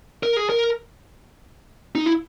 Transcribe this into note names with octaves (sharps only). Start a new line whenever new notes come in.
A#4
G#4
A#4
D#4
E4